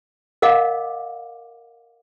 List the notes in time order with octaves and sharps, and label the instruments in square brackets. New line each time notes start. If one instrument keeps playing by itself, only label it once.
[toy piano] A#4 D#5 F5 F#5 D6